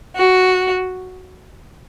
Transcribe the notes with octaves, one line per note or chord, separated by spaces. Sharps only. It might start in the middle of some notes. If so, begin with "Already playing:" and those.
F#4